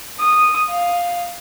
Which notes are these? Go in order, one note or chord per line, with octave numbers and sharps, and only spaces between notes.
D#6
F5